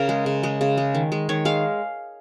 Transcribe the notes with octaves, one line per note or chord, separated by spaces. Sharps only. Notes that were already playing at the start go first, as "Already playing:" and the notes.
Already playing: C#3 A#4
G#3
C#3
G#3
C#3
G#3
D#3
G#3
D#3 C#5
G#3 F5